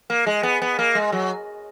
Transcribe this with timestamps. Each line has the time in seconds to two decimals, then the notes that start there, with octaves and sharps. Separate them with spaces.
0.10 A#3
0.27 G#3
0.43 B3
0.62 B3
0.79 A#3
0.95 G#3
1.12 F#3